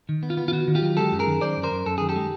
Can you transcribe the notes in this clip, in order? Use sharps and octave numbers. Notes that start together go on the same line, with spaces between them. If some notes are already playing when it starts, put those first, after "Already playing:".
D#3
B3
F4
B3
F4
D#3 F#4
D#3
F4 G4
F#3
G#3 G4 A4
F#2
G#4 A#4
D#3
F#2 C5 D5
F#2
A#4 C5
F#2
F#2 A4
D#3 G#4
G4 A4
G#3